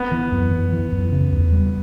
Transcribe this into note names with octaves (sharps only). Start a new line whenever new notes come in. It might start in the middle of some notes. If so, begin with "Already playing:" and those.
Already playing: B3
E3
F#2
E3
E3
F#2
C#3
E2
G3